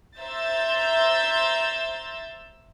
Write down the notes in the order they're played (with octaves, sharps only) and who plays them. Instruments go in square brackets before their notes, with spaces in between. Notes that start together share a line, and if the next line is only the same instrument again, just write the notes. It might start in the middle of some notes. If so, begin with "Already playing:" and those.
[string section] C5 E5 A#5 E6 G6 A6